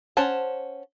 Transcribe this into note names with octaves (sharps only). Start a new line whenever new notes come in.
C#4 C5 F#5 A5